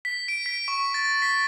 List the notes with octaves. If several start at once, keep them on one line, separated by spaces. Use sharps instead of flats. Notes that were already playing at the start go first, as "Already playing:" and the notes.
B6
D7
B6
C#6
A6
B6